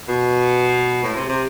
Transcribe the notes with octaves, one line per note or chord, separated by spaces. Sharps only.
B2
A2
C3
C3